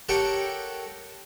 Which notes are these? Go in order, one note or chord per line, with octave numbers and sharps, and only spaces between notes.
G4 A4 A#4 C#5 F#5 G5